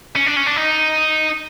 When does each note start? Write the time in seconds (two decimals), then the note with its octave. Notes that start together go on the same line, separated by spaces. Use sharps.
0.16 C#4
0.27 D4
0.37 C#4
0.47 D4
0.57 D#4